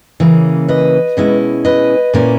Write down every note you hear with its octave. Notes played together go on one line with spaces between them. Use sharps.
C#3 E3 A#3 C#4
B4 D#5
B2 G#3 C#4 E4
B4 D#5
A#2 A#3 C#4 E4